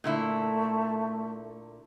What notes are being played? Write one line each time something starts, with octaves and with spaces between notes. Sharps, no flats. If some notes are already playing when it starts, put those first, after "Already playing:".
A#2 D3 A3 E4